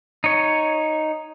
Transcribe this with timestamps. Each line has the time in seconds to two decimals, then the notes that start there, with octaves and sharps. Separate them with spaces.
0.24 D#4 C#5